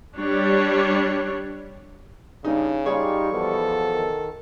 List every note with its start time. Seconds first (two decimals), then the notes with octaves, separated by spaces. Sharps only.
0.17 G3 D4 C#5
2.45 G2 C#3 D#4
2.86 G3 D#4 F4 G4 G#4 C#5 C#6
3.32 E2 B2 F3 A4
3.92 D#3